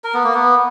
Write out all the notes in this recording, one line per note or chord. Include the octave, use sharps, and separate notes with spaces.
A#4
B3
A#3
B3